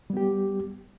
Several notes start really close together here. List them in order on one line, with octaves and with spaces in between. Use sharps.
G3 B3 G4